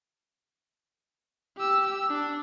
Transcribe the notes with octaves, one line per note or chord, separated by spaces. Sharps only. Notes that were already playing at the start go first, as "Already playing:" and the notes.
G4 E6
D4